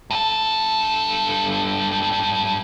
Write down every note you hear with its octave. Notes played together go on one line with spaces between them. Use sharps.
G2 A4